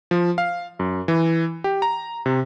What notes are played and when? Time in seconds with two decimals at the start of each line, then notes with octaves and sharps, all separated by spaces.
0.11 F3
0.38 F5
0.79 F#2
1.08 E3
1.64 G4
1.82 A#5
2.26 C3